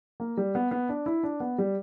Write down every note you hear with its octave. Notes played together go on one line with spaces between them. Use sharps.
A#3
G3
B3
B3
D4
E4
D4
B3
G3